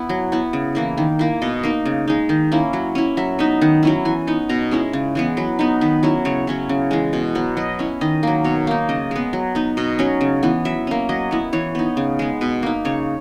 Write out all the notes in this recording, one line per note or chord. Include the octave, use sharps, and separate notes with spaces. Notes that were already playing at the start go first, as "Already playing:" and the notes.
Already playing: B3 E4 E5
F#3
B3 E4
C#3
E3 A#3 E4
D#3
A#3 E4
B2 D#5
A#3 D#4
C#3
G#3 D#4
D#3
A#3 C#4 E4
F#3
C#4 E4
F#3 E5
B3 D#4 E5
D#3 F#5
F#3 C#4 E4
E3 G#5
B3 D#4
B2 A#5
G#3 C#4 E4
C#3
E3 G#3 B3
F#3 B4
B3 D#4
D#3 B4
F#3 C#4 E4
C#3 C#5
F#3 C#4 E4
C#3
E3 G#3
B2
F#3 B3
F#3 D#5
C#4 E4
D#3 D#5
F#3 A#3
B2 C#5
A#3 D#4
C#3 D#5
G#3 B3
F#3
B3 D#4
B2 D#5
F#3 C#4
C#3
E3 B3
F#3 E5
A#3 C#4
F#3 D#5
B3 E4
E3 C#5
B3 D#4
C#3
G#3 B3
B2 B4
A#3 D#4
C#3 C#5